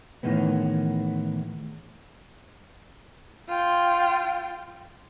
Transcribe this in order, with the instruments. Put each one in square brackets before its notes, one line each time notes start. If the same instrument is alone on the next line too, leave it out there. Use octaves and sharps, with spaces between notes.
[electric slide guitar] A2 D#3 E3 G#3 B3
[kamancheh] F4 G5